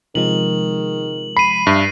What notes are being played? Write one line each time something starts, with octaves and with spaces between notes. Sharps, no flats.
C3 D#3 F3 G#3 F#7
B5 C7 D#7
G2 E5